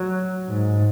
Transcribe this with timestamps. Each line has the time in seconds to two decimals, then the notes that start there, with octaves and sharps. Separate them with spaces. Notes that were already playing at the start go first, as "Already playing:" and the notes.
Already playing: F#3
0.49 G#2